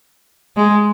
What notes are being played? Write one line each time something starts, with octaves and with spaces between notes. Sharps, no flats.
G#3